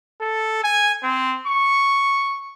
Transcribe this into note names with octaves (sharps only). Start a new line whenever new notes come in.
A4
G#5
C4
C#6